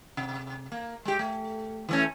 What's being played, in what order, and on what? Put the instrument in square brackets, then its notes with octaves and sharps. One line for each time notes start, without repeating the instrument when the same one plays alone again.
[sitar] C3
A#3
G#3 G4
A3
E3 A3 C#4